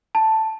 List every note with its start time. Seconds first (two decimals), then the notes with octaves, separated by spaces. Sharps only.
0.15 A5